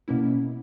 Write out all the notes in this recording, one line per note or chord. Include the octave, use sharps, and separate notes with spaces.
B2 A#3 C#4 E4